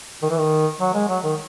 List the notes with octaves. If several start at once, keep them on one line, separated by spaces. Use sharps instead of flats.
D#3
E3
D#3
F#3
G#3
F#3
D#3